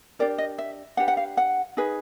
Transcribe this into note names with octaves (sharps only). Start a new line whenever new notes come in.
D4 G4 A#4 D5
D#5
E5
D4 G4 B4 F#5
F#5
F5
F#5
D#4 G#4 B4